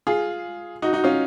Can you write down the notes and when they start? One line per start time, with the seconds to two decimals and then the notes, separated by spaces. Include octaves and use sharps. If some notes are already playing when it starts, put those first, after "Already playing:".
0.07 F4 G#4
0.82 D#4 F#4
0.93 D#4 F#4
1.04 C#4 F4